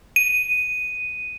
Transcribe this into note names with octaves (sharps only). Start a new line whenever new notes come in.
D#7